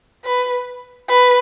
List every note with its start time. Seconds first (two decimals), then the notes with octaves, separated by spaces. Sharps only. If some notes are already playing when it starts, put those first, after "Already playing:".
0.24 B4
1.09 B4